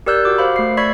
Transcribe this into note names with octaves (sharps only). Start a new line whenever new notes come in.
G4 A#4 D5 E6 F#6 G6
F#4 D6
C5 F5 B5
A3 C7
D5 B5 C#6 E6 G#6 B6